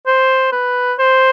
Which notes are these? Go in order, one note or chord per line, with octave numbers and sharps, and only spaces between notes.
C5
B4
C5